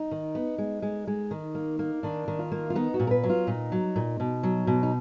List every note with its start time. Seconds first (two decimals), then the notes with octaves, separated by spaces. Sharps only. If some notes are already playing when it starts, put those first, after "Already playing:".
Already playing: D#4
0.11 D#3
0.35 B3
0.58 G#3
0.82 G#3
1.07 G#3
1.31 D#3
1.55 A#3
1.79 A#3
2.03 D#3 D4
2.28 D#3
2.39 F4
2.52 A#3
2.70 F4
2.75 B3 D#4
2.94 F#4
3.00 A#2
3.07 A#4
3.11 B4
3.23 F#3
3.30 F4
3.47 A#2 D#4
3.72 F#3
3.96 A#2
4.20 B2
4.43 F#3
4.67 B2
4.83 D#4